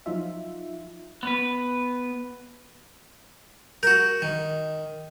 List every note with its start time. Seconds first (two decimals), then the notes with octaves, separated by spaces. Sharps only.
0.06 F3 F#3 D#4 F4 E5
1.23 B3 B4
3.83 F#4 A#4 G6
4.22 D#3